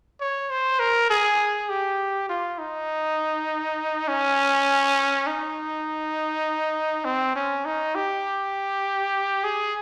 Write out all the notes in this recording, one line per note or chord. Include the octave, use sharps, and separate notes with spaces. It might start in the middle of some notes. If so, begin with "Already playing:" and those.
C#5
C5
A#4
G#4
G4
F4
D#4
C#4
D#4
C4
C#4
D#4
G4
G#4